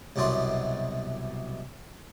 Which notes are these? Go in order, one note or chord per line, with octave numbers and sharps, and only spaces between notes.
C2 F#2 B2 D4 C6